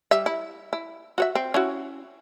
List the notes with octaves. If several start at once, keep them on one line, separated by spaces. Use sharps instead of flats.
G3 E5
E4
E4
F#4 C#5 E5
C4
C#4 E4 F#4